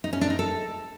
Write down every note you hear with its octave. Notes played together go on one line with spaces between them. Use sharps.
D#4
C#4
D4
D#4
A4